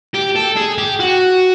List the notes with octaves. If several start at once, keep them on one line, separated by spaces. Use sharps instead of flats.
G4
A4
G#4
G4
F#4